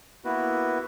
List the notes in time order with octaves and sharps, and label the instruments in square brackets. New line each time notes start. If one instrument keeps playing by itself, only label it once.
[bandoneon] A#3 B3 E4 F#4 B4